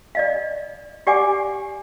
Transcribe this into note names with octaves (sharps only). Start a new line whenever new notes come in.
D5 D#5 F5
G4 D5 F#5 G#5 D6